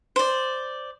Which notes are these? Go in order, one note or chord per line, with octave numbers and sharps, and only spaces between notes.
C5 D5